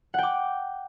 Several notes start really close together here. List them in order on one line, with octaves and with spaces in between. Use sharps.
F#5 G5 D6